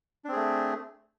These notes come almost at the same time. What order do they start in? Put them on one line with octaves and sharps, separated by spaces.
D4 C4 G#4 A3